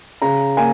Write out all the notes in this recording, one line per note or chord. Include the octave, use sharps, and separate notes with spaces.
C#3 A#5
A#3 G#5